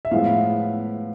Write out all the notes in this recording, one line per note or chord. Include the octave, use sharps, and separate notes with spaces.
E5
A2 F3 G#3 B3 F5